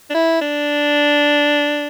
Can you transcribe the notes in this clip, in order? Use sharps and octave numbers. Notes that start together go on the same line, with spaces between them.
D4
E4
D4